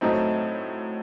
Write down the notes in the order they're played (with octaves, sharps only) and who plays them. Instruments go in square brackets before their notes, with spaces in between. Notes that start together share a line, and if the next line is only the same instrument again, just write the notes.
[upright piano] A2 F#3 A3 C4 [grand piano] D#4